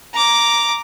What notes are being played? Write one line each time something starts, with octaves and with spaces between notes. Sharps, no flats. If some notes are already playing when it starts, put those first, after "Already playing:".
A#5 D6